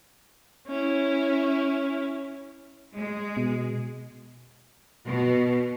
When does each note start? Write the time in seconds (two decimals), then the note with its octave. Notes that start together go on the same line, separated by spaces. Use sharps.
0.67 C#4 E4
2.96 G#3
3.37 B2
5.05 B2